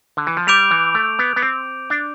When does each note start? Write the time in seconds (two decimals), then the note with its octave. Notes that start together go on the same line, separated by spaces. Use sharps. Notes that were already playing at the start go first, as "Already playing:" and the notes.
0.17 D3
0.27 E3
0.37 F3
0.47 G3 D6 G6 D7 F7
0.71 E3
0.95 A3
1.19 B3
1.36 B3
1.42 C4
1.90 D4